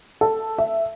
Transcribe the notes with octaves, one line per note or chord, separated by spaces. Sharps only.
A4
E5